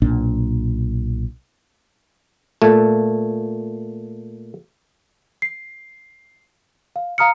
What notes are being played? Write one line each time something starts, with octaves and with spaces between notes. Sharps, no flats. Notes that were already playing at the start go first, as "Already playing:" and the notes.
B1 A#2 D4
A#2 A3
C7
F5
F5 A#5 D#6 F6 C#7